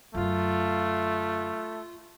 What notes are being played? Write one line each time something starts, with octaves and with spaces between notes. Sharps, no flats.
F#2 D3 A3 F4